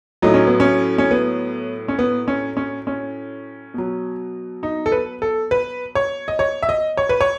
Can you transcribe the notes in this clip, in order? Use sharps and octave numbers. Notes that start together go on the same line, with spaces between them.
A2 F#3 D#4
C#4
B3
C#4
C#4
B3
C#4
B3
C#4
C#4
C#4
B2 F#3
D#4
A4
B4
A4
B4
C#5
D#5
C#5
E5
D#5
C#5
B4
C#5